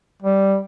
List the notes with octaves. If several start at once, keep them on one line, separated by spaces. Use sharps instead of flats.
G3